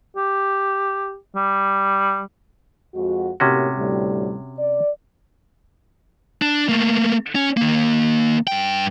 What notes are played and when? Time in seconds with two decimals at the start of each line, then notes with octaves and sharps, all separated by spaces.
0.17 G4
1.36 G3
2.95 F2 G#3 F#4
3.40 A2 C3 A#3 C#4 F#4 G4
3.76 D2 A2 G3
4.58 D5
6.42 D4
6.69 A3 A#3
7.35 C#4
7.57 D#3 A#3
8.47 G2 G5